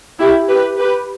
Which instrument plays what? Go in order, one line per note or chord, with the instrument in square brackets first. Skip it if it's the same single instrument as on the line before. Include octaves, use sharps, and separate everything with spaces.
[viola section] E4 G4
G4 B4
G4 B4